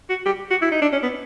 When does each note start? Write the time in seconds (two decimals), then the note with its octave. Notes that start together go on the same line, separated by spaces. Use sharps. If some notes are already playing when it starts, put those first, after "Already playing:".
0.10 F#4
0.25 G4
0.50 F#4
0.62 E4
0.72 D#4
0.82 D4
0.93 C#4
1.03 B3